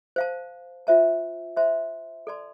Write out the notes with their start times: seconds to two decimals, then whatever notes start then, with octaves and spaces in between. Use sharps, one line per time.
0.16 C5 F5 A5
0.87 F4 C5 E5 A5
1.57 C5 E5 A5 C6
2.27 A4 D5 A5 C6